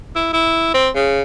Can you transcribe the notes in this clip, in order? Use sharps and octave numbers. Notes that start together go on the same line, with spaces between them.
E4
E4
C4
C#3